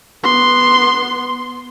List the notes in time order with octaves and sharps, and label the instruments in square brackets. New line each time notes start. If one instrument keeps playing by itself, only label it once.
[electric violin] B3 C6